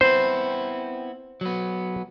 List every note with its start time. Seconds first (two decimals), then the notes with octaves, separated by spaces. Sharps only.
0.01 B3 C4 E4 C5
1.41 F#3 B3